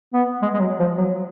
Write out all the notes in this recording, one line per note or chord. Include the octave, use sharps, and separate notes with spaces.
B3
G#3
G#3
F#3
F3
F#3